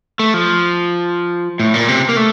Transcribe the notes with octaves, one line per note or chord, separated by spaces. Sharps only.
A3
F3
A2
A#2
C3
A#3
A3